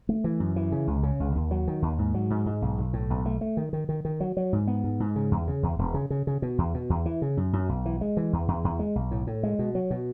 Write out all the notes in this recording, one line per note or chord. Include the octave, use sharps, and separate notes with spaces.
A3
E3
F#2
E3
C#3
C#2
C#3
C#2
D#2
F#3
D#3
D#2
G#2
F#3
G#2
G#2
B1
B1
A2
B1
A3
A3
D#3
D#3
D#3
D#3
F#3
F#3
G#2
B3
G#2
G#2
C#3
E2
C#3
E2
E1
C#3
C#3
C#3
B2
E2
B2
E2
E3
C#3
F#2
F#2
B1
E3
G#3
E3
E2
E2
E2
G#3
B1
A2
A2
G#3
B2
F#3
B2